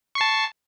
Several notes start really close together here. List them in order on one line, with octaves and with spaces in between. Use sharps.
C#6 C7 A5